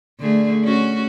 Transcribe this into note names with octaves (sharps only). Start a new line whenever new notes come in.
D3 A3 G#4
C#4 F#4